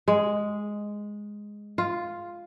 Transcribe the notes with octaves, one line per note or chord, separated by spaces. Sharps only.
G#3
F4